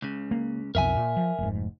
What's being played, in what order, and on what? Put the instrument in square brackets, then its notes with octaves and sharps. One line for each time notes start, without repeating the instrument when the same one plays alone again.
[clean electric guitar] C#2 C#3
[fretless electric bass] A#3
[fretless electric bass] B1 F2 [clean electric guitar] A#4 E5 G#5
[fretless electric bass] A#2
F3
F1 G#2